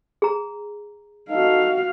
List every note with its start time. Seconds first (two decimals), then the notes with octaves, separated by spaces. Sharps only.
0.22 G#4 A#5
1.30 D#4 F#4 A4 F5